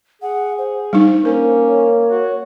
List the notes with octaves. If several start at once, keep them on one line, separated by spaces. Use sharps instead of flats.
G#4 F#5
C5
G3 D4 D#4
A#3 C#4 A#4
C#5
F#4